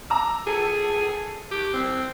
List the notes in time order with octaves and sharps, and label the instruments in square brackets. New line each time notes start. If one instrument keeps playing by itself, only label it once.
[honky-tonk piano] A#5 D6 E6
[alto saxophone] G#4 [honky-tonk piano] A4
[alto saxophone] G4
C4